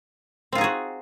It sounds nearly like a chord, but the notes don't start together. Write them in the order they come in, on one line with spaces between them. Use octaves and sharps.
C4 F4 D#4 G#4 F#4